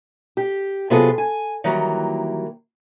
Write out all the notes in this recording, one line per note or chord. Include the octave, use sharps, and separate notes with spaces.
G4
C3 F#3 B3 F4 G#4 A4
G#5
D#3 E3 F#3 G3 A#3